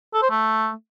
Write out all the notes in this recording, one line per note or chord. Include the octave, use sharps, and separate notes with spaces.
A4
C5
A3